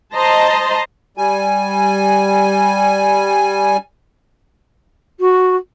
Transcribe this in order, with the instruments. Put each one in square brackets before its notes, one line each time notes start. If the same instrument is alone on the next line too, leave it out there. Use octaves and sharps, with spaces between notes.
[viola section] C5 D#5 A5 A#5 C6
[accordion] G3 G#5
[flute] F#4